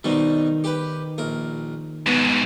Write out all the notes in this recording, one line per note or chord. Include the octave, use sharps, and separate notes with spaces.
B2 D#3 G3 C4 D#4
G4 B4
A#1 A#4
G#2 B2 B3